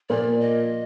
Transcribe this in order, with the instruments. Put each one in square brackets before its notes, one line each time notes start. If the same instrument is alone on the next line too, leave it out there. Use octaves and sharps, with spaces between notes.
[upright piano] A#2 F3 A#3 [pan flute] D5
[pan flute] D#5